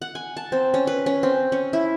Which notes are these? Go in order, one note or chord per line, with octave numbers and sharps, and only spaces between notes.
F#5
G#5
A5
C4
C#4
B4
C#4
C4
C#4
E4